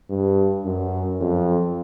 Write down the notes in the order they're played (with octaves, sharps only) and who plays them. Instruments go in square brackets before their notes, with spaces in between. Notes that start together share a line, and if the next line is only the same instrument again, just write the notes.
[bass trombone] G2
F#2
F2